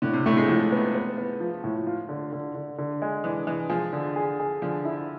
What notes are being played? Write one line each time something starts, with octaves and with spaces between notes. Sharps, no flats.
A2 D3
C3
A2 A3
G#3
A2 F3
B3
B3
B3
F3
A2
F4
D3
D3
D3
D3
G#3
E3 D4
E3 G#3
F3 G#4
D3
G#4
G#4
D3 F3
E4